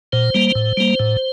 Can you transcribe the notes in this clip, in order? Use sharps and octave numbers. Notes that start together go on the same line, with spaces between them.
A#2 C5
G3 A#3
A2
G3 A#3
A2